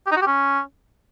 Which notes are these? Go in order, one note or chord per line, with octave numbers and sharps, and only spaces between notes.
G4
D#4
F#4
G4
C#4